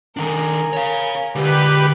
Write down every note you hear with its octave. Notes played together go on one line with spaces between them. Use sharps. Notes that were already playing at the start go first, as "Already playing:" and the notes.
D#3 D4 A#4 G#5
C#5 F5
D3 G#3 G4 B4